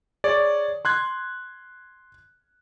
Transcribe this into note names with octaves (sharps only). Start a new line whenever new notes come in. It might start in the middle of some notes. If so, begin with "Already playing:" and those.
G#4 C#5 D5
C6 F#6 G#6